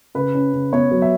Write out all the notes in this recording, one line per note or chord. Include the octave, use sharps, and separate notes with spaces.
C#3 B4
C#4
C#3
B3 C#5
F#3
E5